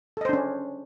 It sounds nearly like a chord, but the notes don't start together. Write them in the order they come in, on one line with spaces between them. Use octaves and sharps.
A4 D#5 C5 D4 C#4